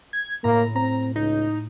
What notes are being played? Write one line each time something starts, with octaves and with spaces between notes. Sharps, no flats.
G#6
A2 A#3 A#5
C4 A#5
C#2 D#4